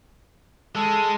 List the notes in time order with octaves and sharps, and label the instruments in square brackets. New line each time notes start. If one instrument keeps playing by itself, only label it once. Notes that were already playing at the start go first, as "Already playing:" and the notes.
[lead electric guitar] G#3 [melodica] A4